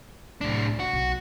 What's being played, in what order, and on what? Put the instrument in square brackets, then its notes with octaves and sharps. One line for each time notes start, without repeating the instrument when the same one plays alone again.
[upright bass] C2 [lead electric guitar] A2 D4
[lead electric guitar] F#4
[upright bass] B1